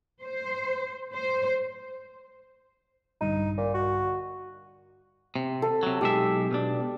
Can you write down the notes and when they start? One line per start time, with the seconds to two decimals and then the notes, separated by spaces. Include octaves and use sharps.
0.23 C5
1.15 C5
3.21 A#1 G2 D3 D#4
3.58 A#2
3.74 F#4
5.36 C3
5.62 A4
5.83 C3 F#3
6.01 B1 G#3 G4 E5
6.51 B2 D4